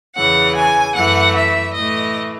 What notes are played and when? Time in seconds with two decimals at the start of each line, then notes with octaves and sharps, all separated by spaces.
0.16 E2 C#3 E3 F#5
0.55 G#5
0.95 F#2 E3 A3 F#5
1.35 E5
1.74 A2 E3 A3 D#5